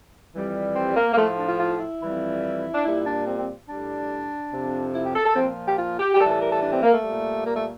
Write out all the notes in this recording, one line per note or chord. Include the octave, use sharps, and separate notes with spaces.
F2 E3 G3
C4
A#3
A#3
A2 F3 A3
D4
F4
F4
E4
F2 E3 G3
D4
A#2 G3 E4
D4
C4
C4
A2 G3 D4
F2 C3 F3
E4
G4
A4
A4
A#2 F3 C4
G4
F4
G4
G4
A2 E3 G3 A4
A4
A#4
A4
D4
C4
A#3
A3
A#2 G3
A#3
A3